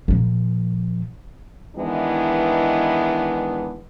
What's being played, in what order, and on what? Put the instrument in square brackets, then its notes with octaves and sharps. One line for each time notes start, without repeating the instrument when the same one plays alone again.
[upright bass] A#2 F3
[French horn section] D#3 E3 G#3 B3 D4 E4